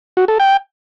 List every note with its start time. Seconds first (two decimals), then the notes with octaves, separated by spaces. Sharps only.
0.17 F#4
0.28 A4
0.40 G5